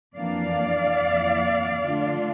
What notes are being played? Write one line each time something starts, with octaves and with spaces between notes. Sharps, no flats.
F2 E3 A#3 D4 D5 F5
F2 E3 A#3
D3 A3 D4 F4